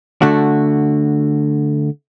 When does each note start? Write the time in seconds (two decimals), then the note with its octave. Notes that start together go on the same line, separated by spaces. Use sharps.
0.22 D3 A3 F#4